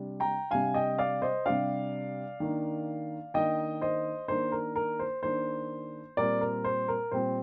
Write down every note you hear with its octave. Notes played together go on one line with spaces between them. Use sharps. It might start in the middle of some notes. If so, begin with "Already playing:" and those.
Already playing: C3 G3 D4
G5 A#5
C3 G3 D4 F5 G#5
D#5 G5
D5 F5
C5 D#5
C3 G3 D4 D5 F5
D#3 A#3 D4
D#3 A#3 D4 D#5 G5
C5 D#5
D#3 A#3 D4 C5
A#4
A#4
C5
D#3 A#3 D4 C5
A#2 G3 C4 A#4 D5
A#4
C5
A#4
A#2 G3 C4 C5